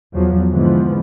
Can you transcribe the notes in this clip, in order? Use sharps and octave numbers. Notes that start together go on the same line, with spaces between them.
E2 F3 F#3
G#2 D3 E3 F3 G#3 B3